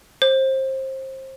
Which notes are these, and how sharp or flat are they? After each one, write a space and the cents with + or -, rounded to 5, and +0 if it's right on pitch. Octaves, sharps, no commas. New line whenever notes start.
C5 +25